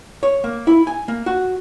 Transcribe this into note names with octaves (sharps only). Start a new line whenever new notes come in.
C#5
A#3
E4
G#5
A#3
F#4